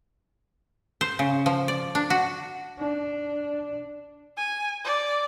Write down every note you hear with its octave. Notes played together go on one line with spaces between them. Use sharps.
C5
C#3
F3
D5
D4
F#4
D4
G#5
D5